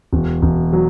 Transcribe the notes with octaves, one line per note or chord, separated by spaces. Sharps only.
E1
E1
F#3